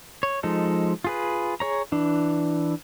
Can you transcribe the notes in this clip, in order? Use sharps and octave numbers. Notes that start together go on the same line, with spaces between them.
C#5
F3 G#3 D#4 A4
F4 G#4 B4
G#4 C#5 A#5
E3 D4